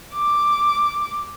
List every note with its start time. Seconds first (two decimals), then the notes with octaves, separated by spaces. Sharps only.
0.14 D6